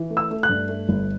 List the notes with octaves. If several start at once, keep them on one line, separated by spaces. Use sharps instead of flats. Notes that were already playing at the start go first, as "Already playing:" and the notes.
Already playing: E3
A3
E6
A3
F#6
G2
A3
G1